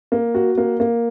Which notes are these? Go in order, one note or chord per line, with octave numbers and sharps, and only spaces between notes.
A#3
F#4
A#3
A#3